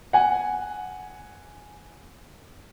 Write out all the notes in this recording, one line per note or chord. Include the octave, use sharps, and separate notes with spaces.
F#5 G#5